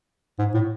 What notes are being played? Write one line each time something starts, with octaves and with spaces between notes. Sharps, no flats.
G#2
A2